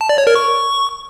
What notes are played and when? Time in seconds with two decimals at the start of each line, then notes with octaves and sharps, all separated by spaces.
0.01 A5
0.09 D5
0.18 C#5
0.27 A#4
0.35 C#6